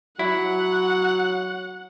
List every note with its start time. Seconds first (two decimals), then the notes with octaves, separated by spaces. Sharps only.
0.19 F#3 E4 F#5